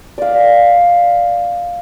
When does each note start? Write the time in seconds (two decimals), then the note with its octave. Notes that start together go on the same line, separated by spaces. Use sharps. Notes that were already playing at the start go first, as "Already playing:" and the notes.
0.18 D5 F5